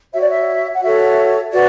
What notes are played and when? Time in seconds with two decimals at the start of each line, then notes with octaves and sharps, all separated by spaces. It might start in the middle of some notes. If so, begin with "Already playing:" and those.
0.13 F#4 C#5 E5
0.21 D5
0.28 E5
0.74 F#5
0.83 F#4 A4 C#5 E5
1.52 F#4 B4 D5